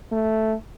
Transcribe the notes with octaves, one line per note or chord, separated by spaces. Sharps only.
A3